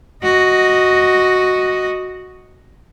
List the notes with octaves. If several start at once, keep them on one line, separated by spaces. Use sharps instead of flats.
F#4 D#5